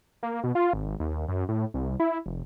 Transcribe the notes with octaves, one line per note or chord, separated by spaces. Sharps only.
A#3
B2
F4
G#1
D#2
F#2
A2
C2
E4
F1